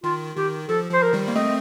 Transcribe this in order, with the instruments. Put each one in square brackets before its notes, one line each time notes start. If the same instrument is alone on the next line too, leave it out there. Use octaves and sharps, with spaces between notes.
[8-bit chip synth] D#3 [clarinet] F4
[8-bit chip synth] D#3 [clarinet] G4
[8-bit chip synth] F3 [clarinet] A4
[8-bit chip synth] F3 [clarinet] C5
[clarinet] A#4
[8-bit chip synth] D#3 G3
A#3
[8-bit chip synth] A3 C4 [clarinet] D#5